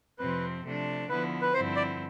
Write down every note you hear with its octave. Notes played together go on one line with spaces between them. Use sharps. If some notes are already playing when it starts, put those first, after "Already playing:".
F2 C3 F3 C4 B4
C3 F3 A3 D4
D3 F3 B3 E4 B4
B4
G2 D3 F3 C4 E4 C5
D5